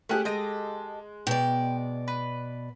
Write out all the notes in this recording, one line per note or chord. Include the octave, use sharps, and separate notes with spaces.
A3 C#4 G4 G#4 F#6
G#3 G4 A4 D#5
B2 D5 G5
B4